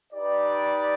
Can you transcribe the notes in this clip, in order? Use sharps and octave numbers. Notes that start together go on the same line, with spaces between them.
D#4 G4 B4 D5